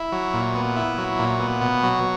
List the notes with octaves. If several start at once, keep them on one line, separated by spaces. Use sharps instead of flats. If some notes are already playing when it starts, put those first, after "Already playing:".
Already playing: E4
F#3
A#2
B3
E4
F#3
A#2
B3
B2
F#3